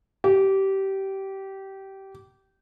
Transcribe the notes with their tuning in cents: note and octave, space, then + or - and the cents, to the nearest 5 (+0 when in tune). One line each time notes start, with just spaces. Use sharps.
G4 -20